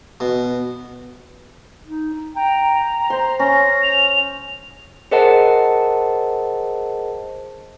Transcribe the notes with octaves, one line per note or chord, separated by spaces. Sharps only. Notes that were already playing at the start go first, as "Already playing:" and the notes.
B2
D#4
D#4
G5 A#5
C5 C6
C#4 A#6
F7
G#4 A#4 C5 D#5 F#5 A5